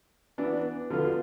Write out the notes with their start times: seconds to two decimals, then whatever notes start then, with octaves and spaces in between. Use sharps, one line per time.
0.38 E3 B3 D4
0.90 D3 F3 B3 F4